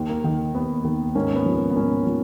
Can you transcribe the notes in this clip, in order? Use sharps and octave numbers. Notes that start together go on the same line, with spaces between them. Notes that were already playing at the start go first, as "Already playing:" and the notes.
Already playing: D#2 D#3
A#3
D#3
D#2 B3
D#3
G#2 A#3 C#4
B3
F3
B3
B3
G#2 A#3 C#4
F3